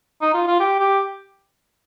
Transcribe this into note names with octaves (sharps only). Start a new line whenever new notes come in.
D#4
F4
F4
G4
G4